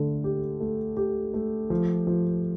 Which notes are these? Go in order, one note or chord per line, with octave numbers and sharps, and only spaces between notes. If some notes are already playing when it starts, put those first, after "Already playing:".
Already playing: D3 A3
G4
A3
G4
A3
F3
F3